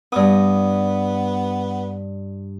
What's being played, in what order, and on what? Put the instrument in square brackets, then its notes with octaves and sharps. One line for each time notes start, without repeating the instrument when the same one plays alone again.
[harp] G2 D#6 [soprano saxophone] B3